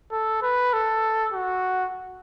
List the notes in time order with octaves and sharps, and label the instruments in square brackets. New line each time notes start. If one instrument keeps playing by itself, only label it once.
[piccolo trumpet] A4
B4
A4
F#4